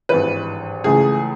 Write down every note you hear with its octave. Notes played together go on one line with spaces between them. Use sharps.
G#1 G2 E3 B4
C#2 C#3 E3 A3 G#4